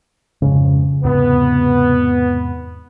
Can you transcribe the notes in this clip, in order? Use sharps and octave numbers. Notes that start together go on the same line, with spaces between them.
F2 G#2 C#3
E2 G#2 C3 B3